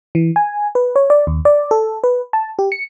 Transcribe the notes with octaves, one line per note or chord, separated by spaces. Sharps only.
E3
G#5
B4
C#5
D5
D#2
D5
A4
B4
A5
G4
C#7